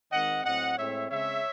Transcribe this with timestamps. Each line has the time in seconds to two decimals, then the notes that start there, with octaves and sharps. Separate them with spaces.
0.12 D#3 G#3 C4 D#5 F#5
0.45 A2 F#3 C4 D#5 F#5
0.78 A2 G#3 C4 C#5 E5
1.10 C#3 G#3 C4 C#5 E5